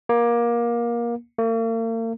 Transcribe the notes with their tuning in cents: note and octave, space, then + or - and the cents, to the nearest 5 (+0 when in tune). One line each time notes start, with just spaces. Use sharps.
A#3 +20
A#3 -45